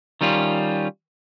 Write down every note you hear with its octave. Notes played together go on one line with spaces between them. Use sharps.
D#3 G3 C#4 F4